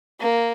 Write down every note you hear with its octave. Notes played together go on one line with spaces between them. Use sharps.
A#3